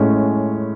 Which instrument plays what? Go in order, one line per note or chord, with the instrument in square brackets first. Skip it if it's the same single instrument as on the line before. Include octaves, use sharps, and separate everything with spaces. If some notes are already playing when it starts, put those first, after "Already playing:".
Already playing: [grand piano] A2 G#3 C#4